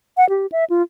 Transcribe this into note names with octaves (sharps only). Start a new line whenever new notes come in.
F#5
G4
E5
F4